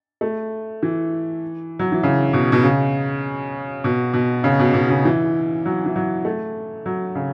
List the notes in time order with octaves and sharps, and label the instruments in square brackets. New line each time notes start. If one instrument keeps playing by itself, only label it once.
[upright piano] A3
E3
F#3
E3
C#3
B2
B2
C#3
B2
B2
C#3
B2
B2
C#3
E3
F#3
E3
F#3
A3
F#3
C#3